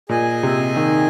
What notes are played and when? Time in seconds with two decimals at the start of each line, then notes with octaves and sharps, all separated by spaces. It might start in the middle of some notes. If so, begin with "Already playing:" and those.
0.09 A#2 G#4 D#5 G#5
0.43 C3
0.76 D#3